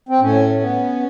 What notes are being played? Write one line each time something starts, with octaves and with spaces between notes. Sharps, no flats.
C4
A2 C#4
B3